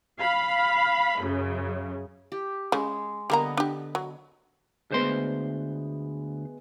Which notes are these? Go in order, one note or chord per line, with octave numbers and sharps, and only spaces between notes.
F5 B5
F#2 C#3
G4
C#3 G#3
D3 G3 A#3 B3 D#5 A#5
D4 G4
F#3
D2 G#3 B3 C5 C6